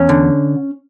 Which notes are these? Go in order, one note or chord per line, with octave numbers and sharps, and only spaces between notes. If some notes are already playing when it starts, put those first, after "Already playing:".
Already playing: E2 C#4
D3